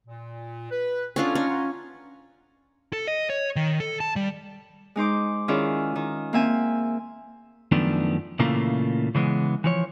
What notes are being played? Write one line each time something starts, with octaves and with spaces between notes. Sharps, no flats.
A#2
B4
C#3 B3 C#4 D4 F4 A4
C#4 D#4 D#5
F#5 A#5 C6
A4
D#5
C#5
D#3
A4
A5
G3
G#3 D#4 C5 D6
D#3 C#4 E4 F4 G#4 D5
D#3
A#3 C4 E5 G#5
F#2 D#3 F3 A3 B3 D4
A#2 C#3 E3 A3 A#3 F4
C#3 E3 G#3 B3
E3 F3 C#5